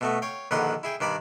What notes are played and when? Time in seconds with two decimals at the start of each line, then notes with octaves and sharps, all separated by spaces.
0.01 B2 A3 B3
0.22 C#5 F5 G5
0.51 A#1 D3 D#3 B4 F#5 C6
0.83 E4 G#4 G5
1.00 G2 D#3 D5 B5 D6